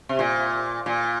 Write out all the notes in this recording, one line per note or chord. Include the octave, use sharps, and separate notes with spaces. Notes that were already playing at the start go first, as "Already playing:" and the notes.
C3
A#2
A#2